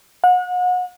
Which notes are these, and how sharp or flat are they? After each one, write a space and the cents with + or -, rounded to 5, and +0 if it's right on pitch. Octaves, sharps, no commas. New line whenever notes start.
F#5 -35